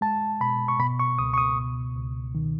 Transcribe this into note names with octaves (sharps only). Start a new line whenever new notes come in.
G#3 A5
B2 B5
C#6
B2 B5
C#6
C#2 D#6
C#6
D#6
B2
C#2
D#3